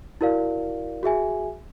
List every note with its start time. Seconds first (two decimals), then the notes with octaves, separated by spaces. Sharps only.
0.21 E4 F#4 A#4 D5 F5
1.03 F#4 G#4 E5 G#5